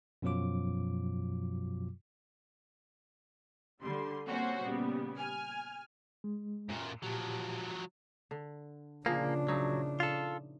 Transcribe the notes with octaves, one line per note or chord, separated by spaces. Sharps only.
F#2 B2 F3 F#3 F4 D6
D3 G3 C6
G3 A#3 C4 C#4 F#4 C5
A#2 C#3 G3 B3
G#5 F6
G#3
F#2 A#2
A#2 F3 F#3 G4
D3
A#2 C#3 F3 A#3 D4 G#4
F3 F#3 D#4 E4
F4 A4